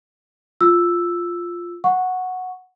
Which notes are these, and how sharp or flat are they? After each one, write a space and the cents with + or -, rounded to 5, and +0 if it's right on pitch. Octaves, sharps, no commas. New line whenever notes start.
F4 +0 E6 +0
F#5 -5 C#6 +0